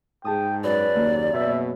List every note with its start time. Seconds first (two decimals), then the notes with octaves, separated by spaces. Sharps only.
0.25 G#2 G#4 G5 A5 D#6
0.64 F#2 B4 D5
0.96 D#2 A#3
1.34 B2 B4 E5